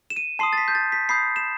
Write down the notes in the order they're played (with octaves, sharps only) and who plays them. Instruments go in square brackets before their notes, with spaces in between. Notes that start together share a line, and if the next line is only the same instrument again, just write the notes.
[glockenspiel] E7
D#7
A5 C6 D#6 C7
A6
B6
G6
A6
B6
B5 D#6 G6 C7
E7